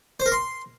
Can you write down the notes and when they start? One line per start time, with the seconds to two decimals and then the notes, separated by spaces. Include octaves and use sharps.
0.20 C5
0.26 A#4
0.32 C6